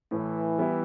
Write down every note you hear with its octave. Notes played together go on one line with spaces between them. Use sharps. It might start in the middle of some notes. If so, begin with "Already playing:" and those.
A2 E3
G3 B3 E4